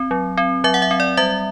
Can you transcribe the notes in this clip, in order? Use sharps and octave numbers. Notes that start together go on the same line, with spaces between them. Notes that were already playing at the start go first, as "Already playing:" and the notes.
Already playing: C4
F#3
C4
F#3 E5
F#5
E5
C4
D5
G3 E5